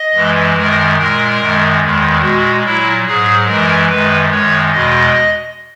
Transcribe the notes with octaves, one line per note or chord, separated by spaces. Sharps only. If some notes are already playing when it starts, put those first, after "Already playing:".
Already playing: D#5
F#2 E3 G#3
F#2 D#3 G#3 A#4
A#2 G#3 A#4
F#2 D#3 G#3
E2 D#3 G#3
A#2 G#3 F#4
A#2 F#3 E4
G#2 F#3 G#4
F#2 E3 G#3 A#4
F#2 D#3 G#3 B4
F#2 D#3 G#3 C#5
E2 B2 G#3 D#5